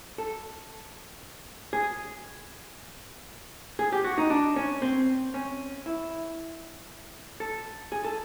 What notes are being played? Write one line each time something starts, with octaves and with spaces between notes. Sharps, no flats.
A4
G#4
G#4
G4
F#4
D#4
D4
C#4
C4
C#4
E4
A4
G#4
A4